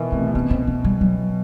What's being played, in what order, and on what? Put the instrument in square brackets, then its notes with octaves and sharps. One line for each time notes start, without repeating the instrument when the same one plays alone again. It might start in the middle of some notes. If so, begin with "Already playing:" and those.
Already playing: [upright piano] B2 D#3 E3
[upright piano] C3 [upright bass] A3
[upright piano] C3
[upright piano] B2 [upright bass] C4
[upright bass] C4
B3
G3
F#3